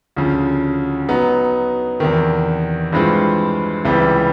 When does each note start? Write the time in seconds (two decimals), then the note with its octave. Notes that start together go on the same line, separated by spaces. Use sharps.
0.16 D2 C#3 F3
1.09 F#3 B3 D#4
2.00 E2 C3 D#3
2.93 G2 E3 G#3 C4 F4
3.85 C#2 C3 E3 G3